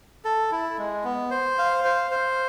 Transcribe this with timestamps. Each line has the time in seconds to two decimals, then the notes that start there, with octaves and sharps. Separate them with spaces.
0.25 A4
0.51 E4
0.78 G#3
1.04 B3
1.31 C5
1.58 F5
1.84 C5
2.11 C5